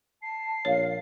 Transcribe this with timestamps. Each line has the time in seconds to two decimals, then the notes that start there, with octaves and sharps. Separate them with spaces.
0.22 A5 C7
0.65 A#1 C#5 F5